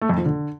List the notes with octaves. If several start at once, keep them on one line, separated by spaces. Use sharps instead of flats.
A3
F2
F3
D3